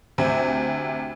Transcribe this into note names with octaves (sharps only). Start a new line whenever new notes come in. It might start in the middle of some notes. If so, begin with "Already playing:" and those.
D2 C3